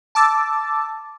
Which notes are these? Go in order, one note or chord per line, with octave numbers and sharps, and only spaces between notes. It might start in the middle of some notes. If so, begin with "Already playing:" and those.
A5 D6 E6 A6